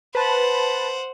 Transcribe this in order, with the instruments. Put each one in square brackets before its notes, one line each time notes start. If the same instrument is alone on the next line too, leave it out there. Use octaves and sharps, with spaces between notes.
[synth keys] B4 A5 [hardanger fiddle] C5 F#5